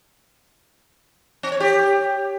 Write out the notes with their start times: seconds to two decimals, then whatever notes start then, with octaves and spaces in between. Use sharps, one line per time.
1.43 C4
1.52 C#5
1.60 G4